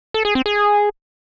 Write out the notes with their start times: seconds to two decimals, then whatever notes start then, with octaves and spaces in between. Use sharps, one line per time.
0.14 A4
0.25 G#4
0.35 C4
0.46 G#4